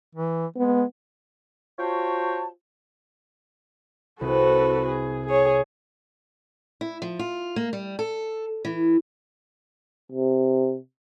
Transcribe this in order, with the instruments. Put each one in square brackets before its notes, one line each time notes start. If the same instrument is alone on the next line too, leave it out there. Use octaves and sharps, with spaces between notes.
[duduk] E3
[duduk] G#3 [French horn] B3
[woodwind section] F4 F#4 C5 C#5 G5 A5
[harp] C2 [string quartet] F#4 A4 B4
[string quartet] G#4
G#4 C#5
[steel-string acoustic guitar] E4
F3
F4
A#3
G3
A4
E3
[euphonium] C3